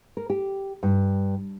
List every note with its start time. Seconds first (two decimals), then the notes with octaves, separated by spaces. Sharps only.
0.17 A#4
0.30 G4
0.83 G2